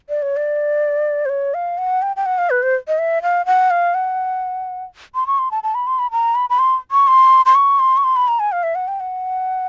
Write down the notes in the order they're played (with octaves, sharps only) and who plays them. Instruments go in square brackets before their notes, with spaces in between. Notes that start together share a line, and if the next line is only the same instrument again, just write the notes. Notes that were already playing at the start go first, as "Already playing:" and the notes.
[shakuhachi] D5
C#5
D5
C5
C#5
F5
F#5
G5
G5
F#5
F5
B4
C5
D#5
E5
F5
F#5
F5
F#5
C6
C#6
C6
A5
A5
B5
C6
B5
A#5
B5
B5
C6
C#6
C6
C6
C#6
C6
C#6
C6
B5
A#5
G#5
F5
E5
F#5
G5
F#5